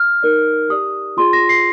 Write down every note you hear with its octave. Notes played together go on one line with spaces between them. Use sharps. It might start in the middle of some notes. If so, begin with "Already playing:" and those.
Already playing: F6
D#4 A#4 D5
G4 D5 D#6
F4 G#4 D5 C6
A#6
C7